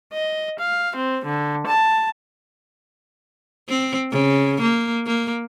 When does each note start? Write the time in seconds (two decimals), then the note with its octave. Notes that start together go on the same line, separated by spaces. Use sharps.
0.13 D#5
0.59 F5
0.96 C4
1.25 D3
1.67 A5
3.69 C4
4.12 C#3
4.61 A#3
5.07 A#3